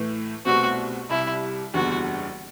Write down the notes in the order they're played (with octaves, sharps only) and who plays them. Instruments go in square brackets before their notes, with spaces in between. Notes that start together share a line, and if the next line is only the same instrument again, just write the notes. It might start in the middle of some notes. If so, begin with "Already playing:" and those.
Already playing: [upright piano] A2 E3 A3
[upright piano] C2 B2 A3 C4 [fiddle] F#4
[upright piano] C2 C3 G3 [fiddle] E4
[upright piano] F#1 E2 D3 G3 [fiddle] F#4